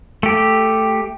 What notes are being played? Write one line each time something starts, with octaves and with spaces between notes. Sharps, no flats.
A3 G4